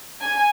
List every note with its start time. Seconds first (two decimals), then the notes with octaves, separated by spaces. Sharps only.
0.21 G#5